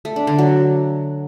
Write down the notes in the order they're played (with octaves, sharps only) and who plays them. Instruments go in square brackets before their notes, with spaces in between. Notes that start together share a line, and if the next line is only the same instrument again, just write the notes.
[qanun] A3
D4
D3
F#3